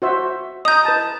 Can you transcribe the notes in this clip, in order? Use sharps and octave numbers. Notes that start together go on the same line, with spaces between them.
F#4 C5 E5
D#5 A#5 D#6 G6
B4 A5